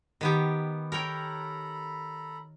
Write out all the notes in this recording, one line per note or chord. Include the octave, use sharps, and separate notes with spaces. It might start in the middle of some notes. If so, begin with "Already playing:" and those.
D#3 B3 G4
A4 A#4 C#5 G5 A#5 B5